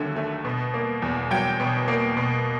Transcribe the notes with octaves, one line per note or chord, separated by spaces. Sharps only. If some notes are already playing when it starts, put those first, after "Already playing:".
Already playing: D#2 D3 F#3 A3
A3
B2
A#3
E2
F#3 G5
B2
A#3
B2